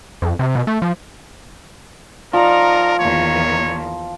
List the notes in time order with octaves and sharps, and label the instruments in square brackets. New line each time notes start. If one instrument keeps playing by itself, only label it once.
[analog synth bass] F2
C3
B2
A3
F3
[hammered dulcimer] F3 [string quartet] D#4 D5 A#5 [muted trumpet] A#4
[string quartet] E2 A#2 D#3 [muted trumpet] C#5